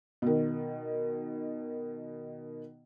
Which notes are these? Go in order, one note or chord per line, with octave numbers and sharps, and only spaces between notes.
B2 D#3